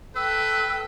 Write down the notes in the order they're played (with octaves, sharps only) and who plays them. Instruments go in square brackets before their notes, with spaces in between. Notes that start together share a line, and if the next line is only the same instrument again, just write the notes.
[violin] A4 G5 [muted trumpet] B4 [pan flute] E6